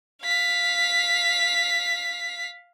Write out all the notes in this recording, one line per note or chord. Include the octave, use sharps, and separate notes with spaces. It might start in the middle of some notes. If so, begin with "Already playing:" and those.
F5 B6